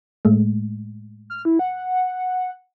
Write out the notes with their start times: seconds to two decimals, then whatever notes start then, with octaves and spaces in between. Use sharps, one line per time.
0.25 A2 G#3 A3
1.30 F6
1.45 E4
1.59 F#5